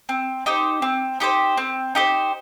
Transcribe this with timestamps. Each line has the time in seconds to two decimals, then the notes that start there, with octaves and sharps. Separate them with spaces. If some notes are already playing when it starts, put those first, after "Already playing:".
0.09 C4
0.46 D#4 G4 C5
0.82 C4
1.20 D#4 G4 C5
1.57 C4
1.95 D#4 G4 C5